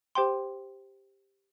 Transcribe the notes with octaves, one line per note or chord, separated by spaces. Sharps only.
G4 C5 G5 C6